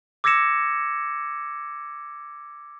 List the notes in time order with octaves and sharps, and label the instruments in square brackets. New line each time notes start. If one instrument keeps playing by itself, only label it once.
[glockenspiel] D6 E6 G#6 A#6 C#7 E7